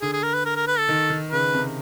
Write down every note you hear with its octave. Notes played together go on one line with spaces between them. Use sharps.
D3 G#4
G#4
A#4
B4
A#4
A#4
B4
A4
D#3
D#3
C#3 B4
C3